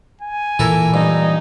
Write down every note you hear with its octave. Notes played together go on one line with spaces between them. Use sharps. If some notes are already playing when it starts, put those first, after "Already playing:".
G#5
A#2 E3 E4 A4 A#4
G2 D#4